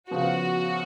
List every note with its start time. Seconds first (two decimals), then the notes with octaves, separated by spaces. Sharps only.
0.11 C#3 F3 B3 F#4